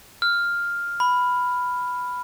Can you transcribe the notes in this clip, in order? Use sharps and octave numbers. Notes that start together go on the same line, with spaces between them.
F6
B5